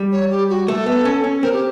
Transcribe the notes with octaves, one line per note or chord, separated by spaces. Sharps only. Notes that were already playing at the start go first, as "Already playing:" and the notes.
Already playing: G3
C#5
G4
F#4
A3 A4
B3
C#4
C#4
C4 A#4
G4